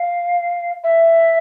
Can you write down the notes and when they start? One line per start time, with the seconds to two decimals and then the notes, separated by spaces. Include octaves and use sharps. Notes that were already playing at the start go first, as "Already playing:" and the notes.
Already playing: F5
0.84 E5